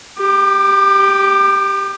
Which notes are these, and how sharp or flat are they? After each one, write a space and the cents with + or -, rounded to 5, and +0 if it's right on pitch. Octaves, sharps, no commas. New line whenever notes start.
G4 +0 D6 +35